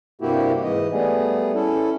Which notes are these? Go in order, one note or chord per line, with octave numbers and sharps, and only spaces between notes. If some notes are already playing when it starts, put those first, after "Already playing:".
G2 C3 A#3 E4 F#4 G4
G#2 E3 D#5
G3 A3 B3 G#4
C#4 E4 A4